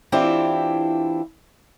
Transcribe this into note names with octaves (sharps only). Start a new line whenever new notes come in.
E3 C4 D4 E4 F4 G4